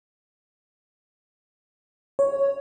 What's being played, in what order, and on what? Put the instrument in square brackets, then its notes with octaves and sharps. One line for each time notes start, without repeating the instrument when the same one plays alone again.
[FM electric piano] C#5